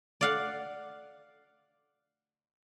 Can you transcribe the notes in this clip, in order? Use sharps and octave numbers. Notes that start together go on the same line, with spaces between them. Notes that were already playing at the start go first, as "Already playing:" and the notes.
D5 F5 F#5